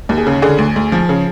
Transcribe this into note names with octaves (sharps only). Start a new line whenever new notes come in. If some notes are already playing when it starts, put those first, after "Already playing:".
D#2
G#4
C#3
D3 G#4
D2
D2
F3
C#3